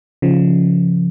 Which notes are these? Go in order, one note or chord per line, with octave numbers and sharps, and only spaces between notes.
C#3 F3